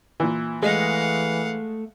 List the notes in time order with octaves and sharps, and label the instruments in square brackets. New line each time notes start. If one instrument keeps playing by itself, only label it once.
[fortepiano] A#2 E3
[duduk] E3 [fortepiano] G#3 D#5 [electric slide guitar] A3 [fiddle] F5 F#5